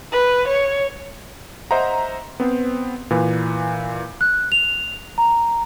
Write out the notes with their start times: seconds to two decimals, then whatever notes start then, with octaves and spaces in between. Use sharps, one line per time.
0.12 B4
0.48 C#5
1.71 C5 D#5 E5 F#5 A#5
2.40 B3 C4 C5
3.10 A#2 E3 B4
4.21 F#6
4.52 F7
5.18 A#5